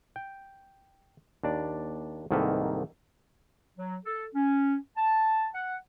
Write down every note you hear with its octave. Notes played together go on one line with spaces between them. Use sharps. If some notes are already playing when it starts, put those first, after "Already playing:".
G5
D#2 D4 D5
C2 G#2 D#3 A#3 A4 B4
F#3
A4
C#4
A5
F#5